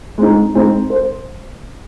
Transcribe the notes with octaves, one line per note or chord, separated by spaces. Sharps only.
G#3 C4 D#4
G#3 C4 D#4
C5